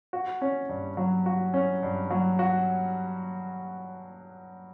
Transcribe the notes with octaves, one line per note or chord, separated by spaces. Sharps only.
F#4
C#4
G2
F#3
F#4
C#4
G2
F#3
F#4